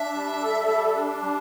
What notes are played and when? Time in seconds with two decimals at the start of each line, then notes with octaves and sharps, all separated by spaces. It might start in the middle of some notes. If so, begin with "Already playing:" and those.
Already playing: D4 E5
0.14 G3
0.41 A4
0.68 G3
0.95 D4
1.22 G3